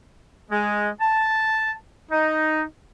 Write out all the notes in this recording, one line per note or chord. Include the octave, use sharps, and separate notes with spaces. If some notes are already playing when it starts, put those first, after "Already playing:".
G#3
A5
D#4